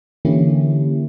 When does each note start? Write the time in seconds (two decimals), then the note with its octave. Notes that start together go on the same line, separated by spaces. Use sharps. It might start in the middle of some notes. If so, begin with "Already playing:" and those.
0.25 D3 E3 A#3 C#4 E4 G4